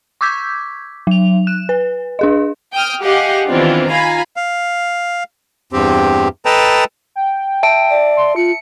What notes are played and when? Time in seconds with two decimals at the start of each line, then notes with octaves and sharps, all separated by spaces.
0.21 C#6 D6 E6 G6 G#6 B6
1.07 F#3 F7
1.47 F#6 E7
1.69 B4
2.19 D4 G#4 D#5
2.74 G5 D#6 F6
3.03 G4 G#4 D#5 F5 F#5
3.47 D#3 E3 B3 C4 D4 F4
3.90 F4 F5 G#5 A#5 B5
4.36 F5
5.73 E2 G2 C4 G4
6.46 A4 B4 D#5 G5 A5 A#5
7.16 G5
7.63 E5 A5 D7
7.90 D5
8.17 C6
8.36 F4 C#7